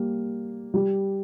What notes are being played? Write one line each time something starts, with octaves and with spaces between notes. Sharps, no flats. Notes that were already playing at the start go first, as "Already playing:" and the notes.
Already playing: G3 A#3
G3